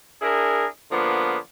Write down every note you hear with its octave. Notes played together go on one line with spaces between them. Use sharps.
D4 E4 G#4 A#4
D3 F3 A#3 B3